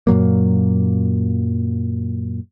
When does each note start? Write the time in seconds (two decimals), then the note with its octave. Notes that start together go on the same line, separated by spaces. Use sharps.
0.07 F#2 A#2 F#3 A#3